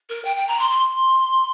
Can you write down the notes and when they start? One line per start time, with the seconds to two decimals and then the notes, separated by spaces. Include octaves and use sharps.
0.09 A#4
0.24 G5
0.36 G5
0.47 A#5
0.59 C6
0.70 C6